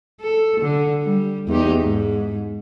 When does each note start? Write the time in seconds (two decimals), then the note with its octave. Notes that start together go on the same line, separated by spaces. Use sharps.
0.21 A4
0.61 D3
1.03 G3
1.48 E2 D#4 G4
1.82 G#2